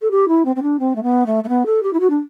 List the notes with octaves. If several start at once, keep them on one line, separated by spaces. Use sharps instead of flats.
A4
G4
E4
C4
C4
D4
C4
A3
B3
A3
A3
B3
A4
G4
E4
F#4
D4